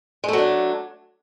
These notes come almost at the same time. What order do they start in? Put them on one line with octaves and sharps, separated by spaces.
G#3 A3 F#3 D4